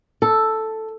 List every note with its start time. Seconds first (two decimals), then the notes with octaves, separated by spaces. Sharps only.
0.22 A4